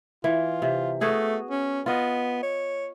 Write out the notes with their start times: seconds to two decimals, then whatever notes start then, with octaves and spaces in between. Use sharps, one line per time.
0.24 E3 F4
0.62 C3
1.01 A3 B3 F#4 G#4
1.50 C#4
1.86 B3 F4 D#5
2.43 C#5